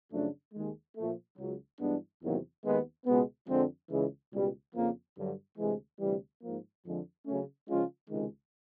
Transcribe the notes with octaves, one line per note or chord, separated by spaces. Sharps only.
F#2 C#3 F3 A3 D4
D#2 D#3 G#3
A#2 F3 A3
C#2 C#3 F#3
G2 E3 G#3 B3 D4
E2 C3 D#3 F#3 A#3
D#2 D#3 G#3 B3
C#2 B2 G#3 B3
F2 D3 F3 G#3 C4
C#2 C#3 E3 G#3
C#2 B2 G3
F2 C#3 F3 A#3
G2 D3 F#3
D2 C3 E3 G#3
D2 C3 E3 G3
G#2 F3 A#3
F2 D3 F3 G#3
C#3 F#3 A3 C#4
C#3 F3 G#3 C#4 F4
C#2 C3 D#3 G#3